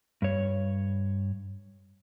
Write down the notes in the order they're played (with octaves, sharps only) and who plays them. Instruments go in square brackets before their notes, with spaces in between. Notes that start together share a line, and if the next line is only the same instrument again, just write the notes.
[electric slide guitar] G2 C#5